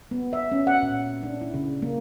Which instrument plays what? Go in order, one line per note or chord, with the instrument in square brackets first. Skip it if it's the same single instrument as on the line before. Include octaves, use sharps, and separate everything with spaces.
[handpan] B3
E5
C#4
F#5
A#2
D4
E4
C#3
A#3